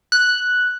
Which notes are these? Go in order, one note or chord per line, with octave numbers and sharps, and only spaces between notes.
F#6